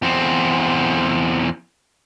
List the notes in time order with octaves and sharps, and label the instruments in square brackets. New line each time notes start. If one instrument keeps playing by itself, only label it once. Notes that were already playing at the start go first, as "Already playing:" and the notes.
[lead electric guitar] E2 C4